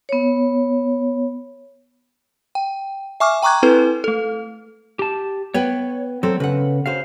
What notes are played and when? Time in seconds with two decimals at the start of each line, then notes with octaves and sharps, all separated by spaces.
0.09 B3 C#5
2.55 G5
3.20 E5 G#5 C#6 D6 F6
3.42 G5 A#5 C#6 D6 F#6 G#6
3.63 C4 E4 A4 B4
4.04 A3 A4
4.99 G4 A5
5.54 B3 B4 C#5 G5
6.23 F#3 C4 A4
6.40 C#3 B4 F#5
6.86 C#3 F#4 C5 F5